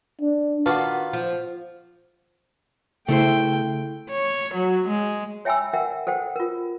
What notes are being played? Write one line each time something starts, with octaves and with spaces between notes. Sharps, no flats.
D4
D#3 F4 F#4 B4 D5 F#5 A5
F3
C#3 A3 E4 C5 G5
C#5
F#3
G#3
C#5 E5 G5 G#5 B5 E6
A#4 E5 F#5 G5
A4 C5 F#5 G5
F4 A#4